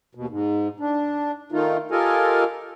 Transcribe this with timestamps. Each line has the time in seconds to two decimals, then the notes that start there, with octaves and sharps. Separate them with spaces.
0.15 D#2 B2
0.29 G#2
0.80 D4
1.52 D#3 A3 D#4 F4
1.91 F4 G4 A4 A#4 D#5 G#5